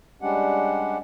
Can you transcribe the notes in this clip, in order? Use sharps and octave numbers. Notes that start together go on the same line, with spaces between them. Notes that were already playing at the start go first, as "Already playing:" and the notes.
G3 G#3 C#4 D4 G4 F#5